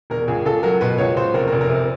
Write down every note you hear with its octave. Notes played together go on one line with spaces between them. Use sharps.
E1 A#4
C#2 G#4
C#2 A4
F#3 A#4
B2 B4
C#2 C#5
C#2 C5
F1 A#4
A#4
F1
A#4
C3
A#4